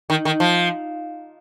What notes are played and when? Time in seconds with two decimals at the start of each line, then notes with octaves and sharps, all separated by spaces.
0.10 D#3
0.25 D#3
0.40 F3